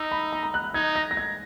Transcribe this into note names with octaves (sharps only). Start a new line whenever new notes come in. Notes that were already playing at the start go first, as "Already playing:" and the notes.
Already playing: D#4 E6
B5
A#5
A#5
F#6
F#6
D#4 G#6
A#6
A#6
G#6